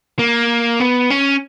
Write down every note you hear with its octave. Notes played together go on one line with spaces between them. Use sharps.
A#3
B3
C#4